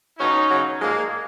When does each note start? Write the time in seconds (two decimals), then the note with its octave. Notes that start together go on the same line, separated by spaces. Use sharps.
0.19 B2 F#3 C#4 D#4
0.50 C#3 F#3
0.80 A#2 F3 G#3 A#3